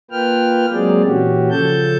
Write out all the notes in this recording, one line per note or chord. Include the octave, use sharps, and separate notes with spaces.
A#3 F4 B4 G5 F6
F#3 G#3 A#3 C4 G#4 D5
A#2 E3 C#4 F#4 G4
C#3 F3 A4 A5 G6